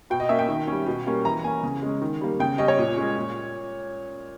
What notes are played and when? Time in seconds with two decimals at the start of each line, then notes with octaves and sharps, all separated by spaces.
0.10 B2 G5
0.20 D#5
0.29 A#3 C#4 E5
0.39 G5
0.48 D#3
0.67 G3 C#4
0.87 B2
1.06 G3 A#3 C#4
1.25 E3 A#5
1.44 A#3 C#4 G#5
1.63 C#3
1.82 G#3 C#4
2.01 D#3
2.21 G3 A#3
2.39 C#3 G5
2.58 G3 C#4 D#5
2.68 C#5
2.78 A#2
2.97 G#3 C#4
3.17 A#2